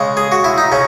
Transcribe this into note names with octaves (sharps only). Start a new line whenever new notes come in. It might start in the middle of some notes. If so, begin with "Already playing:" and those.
Already playing: C#3 G#3
G#4
F#4
E4
D#4
C#3 C#4